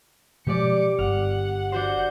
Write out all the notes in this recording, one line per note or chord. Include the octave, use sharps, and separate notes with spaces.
B2 F3 G#3 G4 D5 D6 C#7
G1 F#5 F6
D4 F#4 C5 F#5 G6